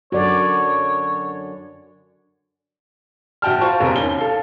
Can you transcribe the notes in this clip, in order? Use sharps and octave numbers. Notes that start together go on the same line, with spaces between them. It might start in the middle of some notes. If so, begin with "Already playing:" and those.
F#2 D3 F#4 C#5 D5
A#1 F#4 G5 A5 F6
F4 C5 A5 C#6
E1 C3 A#3 A#4
D#2 C#4 G7
A4 F5